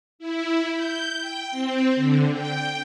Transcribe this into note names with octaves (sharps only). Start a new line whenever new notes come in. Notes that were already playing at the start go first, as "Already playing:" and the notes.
E4
G6
G5
C4
D3
G5